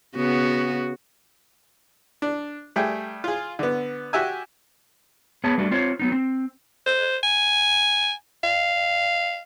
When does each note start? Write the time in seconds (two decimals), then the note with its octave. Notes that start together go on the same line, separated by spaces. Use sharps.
0.16 C#3 B3 F#4
2.22 D4
2.76 G3 A3 G#4 G5
3.24 F4 G#4
3.59 D3 B3
4.13 F#4 G4 E5 G#5
5.44 B3 G#4 B4 C#5 A5
5.58 G3 A3 D4 F#4
5.71 C4 F4 C5 C#5
5.99 F#3 B3 D#4
6.12 C4
6.86 C5
7.23 G#5
8.43 F5